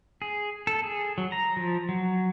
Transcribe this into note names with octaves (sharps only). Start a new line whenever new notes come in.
G#4
A4
G#4
F#3
A#5
F3
F#3